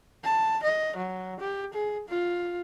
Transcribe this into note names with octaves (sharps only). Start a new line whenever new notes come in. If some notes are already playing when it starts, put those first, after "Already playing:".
A5
D#5
F#3
G4
G#4
F4